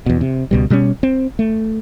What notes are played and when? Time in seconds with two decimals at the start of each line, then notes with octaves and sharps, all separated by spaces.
0.06 E2 B2
0.21 C3
0.51 C#2 B2 G3
0.70 B2 G3 G#3 C#4
1.03 C4
1.39 A3